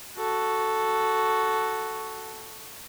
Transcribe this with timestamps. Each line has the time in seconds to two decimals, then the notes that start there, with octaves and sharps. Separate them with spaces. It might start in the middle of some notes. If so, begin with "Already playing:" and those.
0.17 F#4 A4